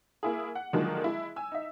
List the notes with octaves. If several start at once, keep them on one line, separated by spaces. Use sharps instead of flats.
A#3 E4 G#4
F#5
D3 D#3 F3 F#3 G#3 A#3
G#3 E4
G#5 E6
D#4 E5